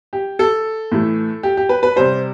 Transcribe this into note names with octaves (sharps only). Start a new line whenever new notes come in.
G4
A4
A2 E3 A3
G4
G4
B4
B4
C3 G3 C5